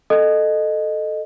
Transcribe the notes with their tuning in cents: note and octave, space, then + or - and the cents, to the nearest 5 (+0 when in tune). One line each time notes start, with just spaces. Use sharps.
A4 +0 D#5 -15